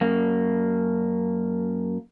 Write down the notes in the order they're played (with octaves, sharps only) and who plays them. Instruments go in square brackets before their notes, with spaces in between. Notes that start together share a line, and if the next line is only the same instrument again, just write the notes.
[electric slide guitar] F#2 A#3